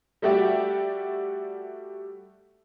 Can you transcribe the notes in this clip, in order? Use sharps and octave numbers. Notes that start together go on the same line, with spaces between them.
G3 A3 F#4 G4 D5 E5